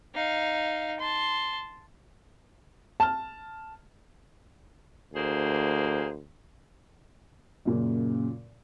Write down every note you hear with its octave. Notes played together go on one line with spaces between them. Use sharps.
D#4 F5
A5 C6
A5 F6
D2 A#3 G#4 C5
F#2 A#2 C#3